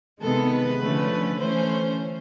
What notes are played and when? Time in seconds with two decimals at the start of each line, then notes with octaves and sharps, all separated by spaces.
0.22 C3 D#3 G#3 B3 A4
0.52 B4
0.82 D3 F3 A3 C#4
1.40 E3 A3 C#4 C5